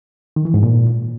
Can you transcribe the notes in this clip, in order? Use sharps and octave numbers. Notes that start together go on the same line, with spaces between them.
D#3
E3
G#2
A#2